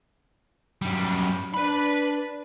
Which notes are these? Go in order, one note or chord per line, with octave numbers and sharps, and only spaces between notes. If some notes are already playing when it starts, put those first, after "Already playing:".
F#2 G3
D4 B4 B5